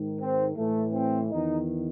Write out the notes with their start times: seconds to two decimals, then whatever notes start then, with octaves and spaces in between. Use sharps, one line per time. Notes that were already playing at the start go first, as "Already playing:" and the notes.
Already playing: G#2 D#3
0.19 C4
0.57 A2 E3 A3
0.93 C4
1.31 E2 D#3 D#4